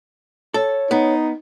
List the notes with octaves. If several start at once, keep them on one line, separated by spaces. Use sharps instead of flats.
A4 C#5
B3 D#4